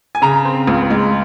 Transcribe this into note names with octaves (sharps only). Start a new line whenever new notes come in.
G#5
C#3 A#5
C4
C#2
G#3